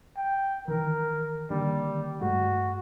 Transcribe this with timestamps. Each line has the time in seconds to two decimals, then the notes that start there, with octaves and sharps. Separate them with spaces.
0.17 G5
0.68 D#3 E3 A#4
1.50 D3 D#3 G3 A#3
2.21 G2 G#3 A3 F#4